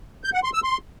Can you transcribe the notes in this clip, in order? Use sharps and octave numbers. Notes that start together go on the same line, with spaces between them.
G6
F#5
C6
E6
C6